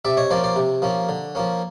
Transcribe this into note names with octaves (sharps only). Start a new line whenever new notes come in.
C3 D5 E5
C#5 D#5
F3 A#3 C#4 C5 D5
C5 D5
C3
F3 A#3 C#4
D3
F3 A#3 C#4